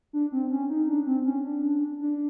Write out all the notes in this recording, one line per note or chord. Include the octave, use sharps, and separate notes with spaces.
D4
C4
C#4
D#4
D4
C4
C#4
D4
D4